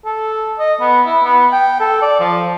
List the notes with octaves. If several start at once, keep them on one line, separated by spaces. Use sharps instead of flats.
A4
D#5
B3
E4
B3
G5
A4
D5
F3